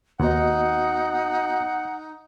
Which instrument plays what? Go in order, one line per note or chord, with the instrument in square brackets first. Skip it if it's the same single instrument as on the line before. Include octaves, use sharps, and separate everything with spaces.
[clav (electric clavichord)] D#2 [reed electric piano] B3 F#4 D#5 [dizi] D#4 [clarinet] F#5